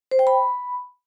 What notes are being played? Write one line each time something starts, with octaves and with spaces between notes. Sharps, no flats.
C5
G5
B5